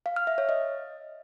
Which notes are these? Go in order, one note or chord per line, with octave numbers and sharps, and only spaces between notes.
F5
F6
E5
C#5
D#5